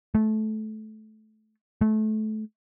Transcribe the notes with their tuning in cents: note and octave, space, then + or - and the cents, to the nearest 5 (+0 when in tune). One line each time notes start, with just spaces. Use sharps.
A3 -20
A3 -25